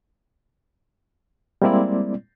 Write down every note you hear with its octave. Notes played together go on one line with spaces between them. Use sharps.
G3 G#3 A#3 C4 E4 D5